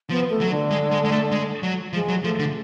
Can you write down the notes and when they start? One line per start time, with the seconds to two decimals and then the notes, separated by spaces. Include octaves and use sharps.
0.10 F3 B3
0.30 A3
0.41 F#3
0.50 D3
0.70 G#3
0.91 G#3
1.05 G#3
1.12 A3
1.31 G#3
1.63 F#3
1.93 F3 G#3
2.08 F#3
2.24 F3 A3
2.39 D3